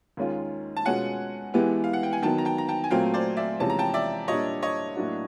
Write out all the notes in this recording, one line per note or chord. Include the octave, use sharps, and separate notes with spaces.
D#2 D#3 G#3 C#4 F4
A5
B2 G#3 C#4 F4 F#5 G#5
E3 G#3 B3 E4 G4
F5
F#5
G5
G#5
D#3 F#3 B3 G5 A5
A#5
G5 A5
A#5
G5 A5
G#5
A#2 F#3 A3 C4 F5 G5
C5 D5
D5 E5
E2 C3 F3 G#3 C#4 A5
A#5
G5 A5
D5 E5
A#2 G3 A#3 D4 C#5 D#5
C#5 D#5
A2 F#3 A#3 D4 F#4